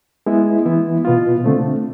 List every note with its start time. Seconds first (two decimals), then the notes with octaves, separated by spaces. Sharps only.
0.26 G#3 B3 E4
0.65 E3 B3 E4
1.05 B2 B3 F4
1.44 D3 A3 C4